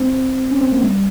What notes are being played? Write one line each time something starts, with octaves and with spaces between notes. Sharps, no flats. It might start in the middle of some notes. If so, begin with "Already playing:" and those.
Already playing: C4
C#4
C4
A#3
G3